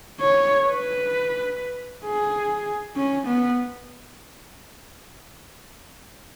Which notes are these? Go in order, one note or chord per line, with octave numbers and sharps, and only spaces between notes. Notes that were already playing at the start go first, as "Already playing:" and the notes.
C#5
B4
G#4
C#4
B3